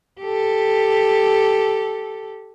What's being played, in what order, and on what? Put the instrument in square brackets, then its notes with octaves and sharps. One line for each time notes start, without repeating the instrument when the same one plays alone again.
[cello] G4 A4